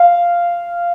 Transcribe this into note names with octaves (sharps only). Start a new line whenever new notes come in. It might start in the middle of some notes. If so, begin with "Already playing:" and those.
Already playing: F5